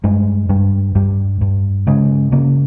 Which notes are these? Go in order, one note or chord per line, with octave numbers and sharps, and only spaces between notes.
G2 G#3
G2 G3
G2 G3
G2
C#3 G#3
C#3 A#3